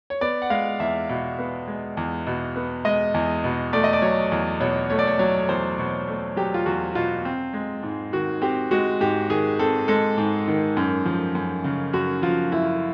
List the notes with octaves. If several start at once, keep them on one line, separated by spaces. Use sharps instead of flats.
C#5
B3 D5
F#5
G#3 F5
E2 E5
B2
B3
G#3
E2
B2
B3
G#3 D#5
E2
B2
A3 D5
D#5
D5
F#3 C#5
E2
B2 C#5
A3 C#5
D5
C#5
F#3 C#5
E2 C5
B2
A3
F#3 G4
F4
E2 F#4
B2 F4
C4
G#3
G#2
D#3 F#4
C4 G4
G#3 F#4
G#2 G4
D#3 G#4
C4 A4
G#3 A4
G#2
D#3
F#2
F3
F#2
C#3
F#2 F#4
F3 F4
F#2 E4